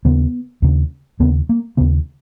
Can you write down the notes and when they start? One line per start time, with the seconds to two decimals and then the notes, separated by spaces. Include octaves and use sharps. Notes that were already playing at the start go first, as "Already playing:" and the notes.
0.05 D#2 C#3 B3
0.62 D#2 C#3
1.20 D#2 C#3 B3
1.49 A#3
1.77 D#2 C#3 B3